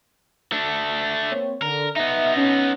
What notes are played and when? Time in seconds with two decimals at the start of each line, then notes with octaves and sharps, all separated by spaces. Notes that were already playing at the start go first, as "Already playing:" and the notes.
0.52 A3 D4
1.31 A#3 C4 C#5
1.62 D3 A#4
1.96 B3 D#4 E5
2.36 C#4